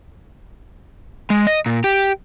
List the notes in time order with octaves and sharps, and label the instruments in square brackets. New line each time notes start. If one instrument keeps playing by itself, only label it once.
[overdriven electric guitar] G#3
D#5
A#2
G4